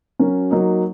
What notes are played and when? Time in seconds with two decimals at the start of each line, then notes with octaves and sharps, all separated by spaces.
0.19 F#3 C#4 F#4 A#4
0.51 F#3 A#3 D#4